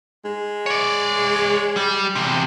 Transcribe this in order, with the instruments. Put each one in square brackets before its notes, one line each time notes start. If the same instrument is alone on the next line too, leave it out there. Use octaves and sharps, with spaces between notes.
[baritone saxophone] G#3
[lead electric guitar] C#5 D5
G3
E2 C3